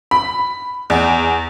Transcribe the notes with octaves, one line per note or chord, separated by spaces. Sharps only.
B5
E2